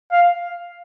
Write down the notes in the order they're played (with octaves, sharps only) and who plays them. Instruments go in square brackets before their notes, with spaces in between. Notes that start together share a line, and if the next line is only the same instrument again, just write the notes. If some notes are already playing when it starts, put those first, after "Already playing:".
[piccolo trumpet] F5